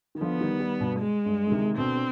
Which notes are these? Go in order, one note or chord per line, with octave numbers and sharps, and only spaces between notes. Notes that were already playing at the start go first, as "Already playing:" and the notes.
D#3
D3 F3 B3
D#3 G3
D#3 G3
G2 B2
G#3
G2
D3
C3 D#3
B2 D3 C4
D3